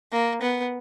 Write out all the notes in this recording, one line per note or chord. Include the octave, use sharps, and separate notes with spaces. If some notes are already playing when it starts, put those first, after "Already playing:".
A#3
B3